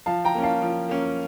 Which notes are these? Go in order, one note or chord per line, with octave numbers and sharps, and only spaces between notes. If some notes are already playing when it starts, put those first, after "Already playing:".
F3 F5 A5
G5 A#5
A#3 C#4
F5 A5
F3
A#3 C#4